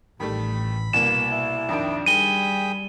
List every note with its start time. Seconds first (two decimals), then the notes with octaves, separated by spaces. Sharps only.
0.20 A1 D#3 G3 A3 B5
0.93 C2 B2 A#3 E7
1.31 E4
1.69 F2 D#3 D4 G5
2.06 D#3 G3 G#4 G5 B5 D#7 G7